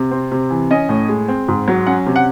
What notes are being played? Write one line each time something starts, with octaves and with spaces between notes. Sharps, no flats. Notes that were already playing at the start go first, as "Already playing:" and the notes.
Already playing: C3
C4
C3
E3
C#4 D#5
A2
G#3
C4
G#2
F#3
C#4 F#5
C3
F#5